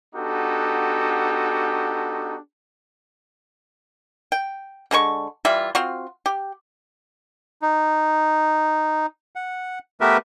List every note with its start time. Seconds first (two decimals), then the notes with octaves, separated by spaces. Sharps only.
0.15 B3 D4 D#4 F#4 G4 A4
4.32 G5
4.91 D3 G#3 B4 C#6
5.45 E3 G3 F4 E5
5.75 C4 F4 F#4
6.26 G4
7.62 D#4
9.36 F#5
10.01 A3 B3 G4 A#4 B4 E5